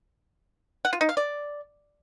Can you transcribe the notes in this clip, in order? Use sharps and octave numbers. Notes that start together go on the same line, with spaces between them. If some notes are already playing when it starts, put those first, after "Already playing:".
F#5
F4
D#4
F5
D5